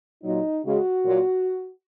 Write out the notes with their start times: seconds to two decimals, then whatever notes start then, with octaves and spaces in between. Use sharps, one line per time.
0.23 A#2 F#3 D#4
0.63 C#3 G#3 F#4
1.04 A#2 F#3